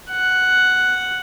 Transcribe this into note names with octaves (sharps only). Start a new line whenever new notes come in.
F#5